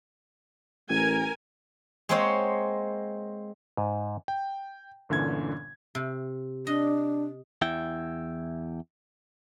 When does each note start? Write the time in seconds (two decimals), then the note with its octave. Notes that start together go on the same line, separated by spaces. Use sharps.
0.90 A1 A#4 G#5
2.09 G#3 A#3 C4 C5 C#5 F#5
3.77 G#2
4.28 G5
5.09 G1 A#2 D3 E3 C#4 G#6
5.95 C3
6.67 D4 D#5
7.62 E2 E4 G5